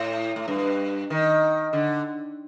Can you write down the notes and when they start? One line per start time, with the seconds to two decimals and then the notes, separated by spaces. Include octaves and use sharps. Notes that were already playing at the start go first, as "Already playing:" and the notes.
Already playing: A2
0.36 A2
0.48 G2
1.10 D#3
1.73 D3